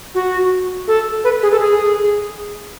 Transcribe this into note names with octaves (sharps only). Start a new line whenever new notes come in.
F#4
A4
B4
G#4
A4
G#4